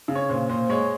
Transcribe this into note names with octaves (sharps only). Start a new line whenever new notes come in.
C#3
C#5
A#2 C5
A#2 C5
G#3 C#5